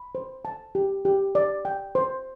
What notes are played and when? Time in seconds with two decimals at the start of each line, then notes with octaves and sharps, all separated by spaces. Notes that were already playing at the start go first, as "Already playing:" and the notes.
Already playing: B5
0.15 C5
0.45 A5
0.75 G4
1.05 G4
1.35 D5
1.65 G5
1.95 C5